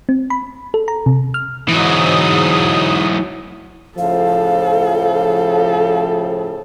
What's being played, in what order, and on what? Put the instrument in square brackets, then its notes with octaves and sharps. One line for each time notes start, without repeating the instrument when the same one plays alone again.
[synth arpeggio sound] C4
B5
A4
A#5
C3
F6
[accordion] G#2 D#6 [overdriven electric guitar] E3 F#3
[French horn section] A2 C#3 F3 [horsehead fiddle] A4 [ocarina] F5